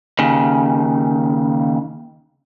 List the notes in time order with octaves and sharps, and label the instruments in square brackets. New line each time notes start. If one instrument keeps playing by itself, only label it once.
[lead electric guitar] D#2 C#3